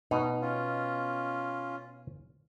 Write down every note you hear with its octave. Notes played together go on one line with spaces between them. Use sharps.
B2 D#4
C#4 F4